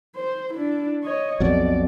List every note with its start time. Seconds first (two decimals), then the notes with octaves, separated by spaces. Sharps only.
0.16 C5
0.54 D4 E4
1.03 C#5 D#5
1.40 B1 F2 B2 D5